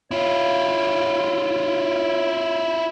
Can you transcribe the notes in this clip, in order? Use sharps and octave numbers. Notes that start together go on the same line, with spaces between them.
E4 F4 C#5